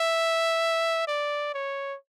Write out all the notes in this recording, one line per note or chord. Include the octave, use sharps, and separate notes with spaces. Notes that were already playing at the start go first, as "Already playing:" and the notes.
Already playing: E5
D5
C#5